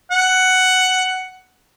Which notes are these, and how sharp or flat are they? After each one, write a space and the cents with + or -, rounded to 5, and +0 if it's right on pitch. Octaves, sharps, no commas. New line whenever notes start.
F#5 +10